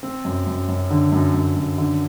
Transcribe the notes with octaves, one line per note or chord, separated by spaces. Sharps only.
C4
F#2
F#2
F#2
D3
F#2
F#2
F#2
D3